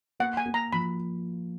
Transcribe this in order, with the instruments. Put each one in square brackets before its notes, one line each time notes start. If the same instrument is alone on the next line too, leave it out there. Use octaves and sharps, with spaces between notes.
[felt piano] A#3 [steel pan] F#5
[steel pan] G#5
[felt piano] A#3
[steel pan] A#5
[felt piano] F3 [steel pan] B5